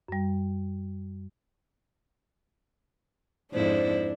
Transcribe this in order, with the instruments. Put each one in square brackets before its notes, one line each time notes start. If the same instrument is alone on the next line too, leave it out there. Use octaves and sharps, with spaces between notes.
[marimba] F#2 G3
[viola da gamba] F2 G#2 E4 [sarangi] D4 [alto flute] C5